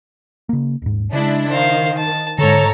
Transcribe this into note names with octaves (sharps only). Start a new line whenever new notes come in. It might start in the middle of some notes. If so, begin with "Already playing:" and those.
C#3 A#3
D#1 G#2
C#3 G#3 D4 E4
D#3 C5 F5
A5
G#2 D3 A4 C#5 A#5